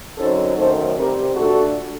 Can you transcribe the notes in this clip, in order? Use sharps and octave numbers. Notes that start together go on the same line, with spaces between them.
F#2 D3 F#3 C4 D#4 A4 C5
F#2 D#3 A3 A4 C5
C3 G3 C4 G4 A#4
A#2 A3 D4 F#4 A4